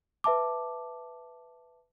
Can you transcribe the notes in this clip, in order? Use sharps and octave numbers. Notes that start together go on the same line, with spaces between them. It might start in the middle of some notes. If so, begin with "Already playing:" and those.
B4 E5 A5 D6